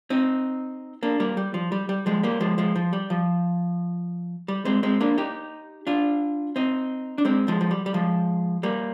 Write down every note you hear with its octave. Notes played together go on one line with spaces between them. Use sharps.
C4 D#4
A#3 D4
G3 A#3
G3
F3
G3
G3
F3 G#3
G3 A#3
F3 G#3
F3 G#3
F3
G3
F3
G3
G#3 C4
G#3 C4
A#3 D4
D#4 G4
D4 F4
C4 D#4
D4
G#3 C4
F3 G#3
F3
G3
G3
F3 G#3
G3 A#3